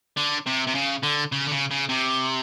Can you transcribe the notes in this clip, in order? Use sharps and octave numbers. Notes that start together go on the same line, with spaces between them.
D3
C3
C3
C#3
D3
C#3
D3
C#3
C#3
C3